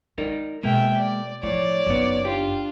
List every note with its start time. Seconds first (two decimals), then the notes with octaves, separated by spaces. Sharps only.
0.18 G#3 D#4 A#4 D5
0.63 B2 G#3 A#3 E5 G5
0.97 D5
1.43 A2 F3 A3 C#5 D5
1.86 F#1 F#3 B3 D#4
2.25 D4 F4 G4